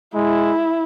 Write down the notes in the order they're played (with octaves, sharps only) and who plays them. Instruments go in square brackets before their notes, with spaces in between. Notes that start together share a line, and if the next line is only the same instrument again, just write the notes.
[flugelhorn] G#3 [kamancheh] E4